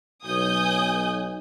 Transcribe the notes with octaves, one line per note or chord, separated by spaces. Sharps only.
B1 G#5 D#6 G6